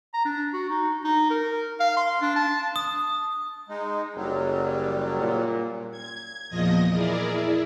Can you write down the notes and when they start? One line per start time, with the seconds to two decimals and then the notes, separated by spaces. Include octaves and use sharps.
0.14 A#5
0.25 D4
0.54 F#4
0.70 D#4
1.04 D#4
1.31 A#4
1.80 F5
1.96 C6
2.22 D4
2.36 A5
2.76 D#6
3.69 G#3 D#4
4.16 F#1 F#3 G3
5.22 A#2
5.91 G#6
6.49 E2 A#2 F3 D#5 D#6 A#6
6.91 E4 G#4 A#4 D5
7.34 E4